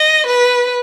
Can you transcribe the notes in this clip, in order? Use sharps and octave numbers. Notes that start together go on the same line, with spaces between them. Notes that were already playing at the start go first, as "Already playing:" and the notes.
Already playing: D#5
B4